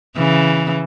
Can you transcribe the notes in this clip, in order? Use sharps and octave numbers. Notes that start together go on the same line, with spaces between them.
C#3 E3